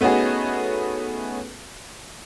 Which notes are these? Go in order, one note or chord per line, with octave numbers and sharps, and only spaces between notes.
A3 B3 C#4 D#4 F#4 G#4